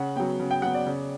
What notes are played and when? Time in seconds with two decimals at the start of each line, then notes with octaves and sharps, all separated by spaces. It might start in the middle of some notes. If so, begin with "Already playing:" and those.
Already playing: C#3 F#5
0.16 F#3 B3 G5
0.40 C#3
0.51 G5
0.62 F#3 B3 F#5
0.75 D5
0.86 C#3